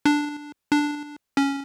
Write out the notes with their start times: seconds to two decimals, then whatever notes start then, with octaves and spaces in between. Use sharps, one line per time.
0.06 D4
0.71 D4
1.37 C#4